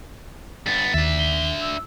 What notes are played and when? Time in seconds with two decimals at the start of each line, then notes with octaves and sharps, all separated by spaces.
0.66 G2 B3 A6
0.94 D#2 D4 E5
1.18 G7
1.61 E6